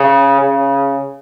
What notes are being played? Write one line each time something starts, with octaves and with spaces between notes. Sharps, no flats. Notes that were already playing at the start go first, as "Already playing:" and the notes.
Already playing: C#3
C#3